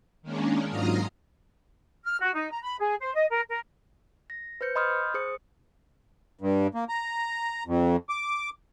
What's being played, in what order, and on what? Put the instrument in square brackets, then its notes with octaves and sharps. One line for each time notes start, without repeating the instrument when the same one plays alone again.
[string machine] D#3 G#3 A#3 C#4 D4
G#2 F#3 F4 A#5 D#6 F6
[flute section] F6
F#4
D#4
A#5
B5
G#4
C5
D#5
A#4
A#4
[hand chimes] A#6
B4 C5 G6 C#7
D#5 B5 C6 D#6 F6 G6
G#4 C5 D#6 C#7
[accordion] G2
A#3
A#5
F2
D6